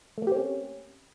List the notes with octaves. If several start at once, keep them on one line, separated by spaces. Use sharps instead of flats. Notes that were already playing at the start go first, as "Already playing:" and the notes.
A3 A#3 C4 C#4 G4